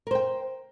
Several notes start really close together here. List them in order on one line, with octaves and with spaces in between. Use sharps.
A#4 C5 G5